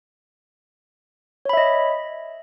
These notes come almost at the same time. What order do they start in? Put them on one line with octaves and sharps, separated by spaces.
C#5 B5 E5 D#5